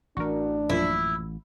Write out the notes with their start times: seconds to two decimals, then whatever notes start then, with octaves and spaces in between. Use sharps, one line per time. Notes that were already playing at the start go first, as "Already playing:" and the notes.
0.17 A1 E3 A3 D4 F#4 A#4
0.69 F#2 A#2 F3 E4